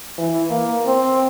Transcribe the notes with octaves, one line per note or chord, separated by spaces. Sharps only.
E3
A#3
C4